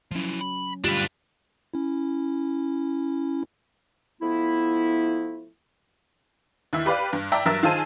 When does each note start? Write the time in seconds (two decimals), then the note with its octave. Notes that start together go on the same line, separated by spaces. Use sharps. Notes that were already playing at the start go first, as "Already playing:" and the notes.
0.11 F3 F#3 C#4 E4
0.41 B5
0.84 D2 G2 D4 F4 G4 B4
1.74 C#4 E4
4.21 F3 A3 B3 E4
6.73 D#2 E4
6.86 G4 B4 D5 F5
7.13 G2
7.32 D5 E5 G5 A5 A#5
7.45 G2 F#3 A#4 E5 E6 A6
7.63 D#3 F4 G#4 C5 A5 D#7